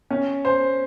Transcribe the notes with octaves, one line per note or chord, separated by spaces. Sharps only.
C#4
C5